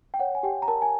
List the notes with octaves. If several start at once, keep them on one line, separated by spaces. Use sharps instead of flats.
G5
C#5 F#5
G#5
G4 G5
A#5
A#4 A5
G#5